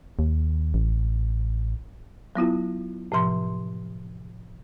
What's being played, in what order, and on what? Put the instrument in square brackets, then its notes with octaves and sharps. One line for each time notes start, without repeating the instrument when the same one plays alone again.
[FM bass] D#2
A1
[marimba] F#3 B3 E4 F4
A2 C3 F3 C6